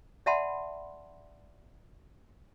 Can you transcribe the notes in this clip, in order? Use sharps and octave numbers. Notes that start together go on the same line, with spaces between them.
D5 E5 F#5 A5 B5 C6